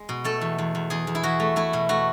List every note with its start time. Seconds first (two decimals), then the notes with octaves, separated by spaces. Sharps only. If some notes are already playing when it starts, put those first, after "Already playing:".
Already playing: G#3
0.09 B2
0.24 A3 A4
0.41 E2
0.58 E2
0.75 E2
0.90 E2 G#4
1.07 E2
1.15 E4
1.23 E2 F#4
1.40 A3
1.56 A3 E4
1.73 B2
1.89 A3 F#4